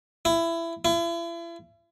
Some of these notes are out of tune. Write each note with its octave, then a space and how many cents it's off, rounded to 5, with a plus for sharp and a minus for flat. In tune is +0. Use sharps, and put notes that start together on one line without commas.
E4 +20
E4 +40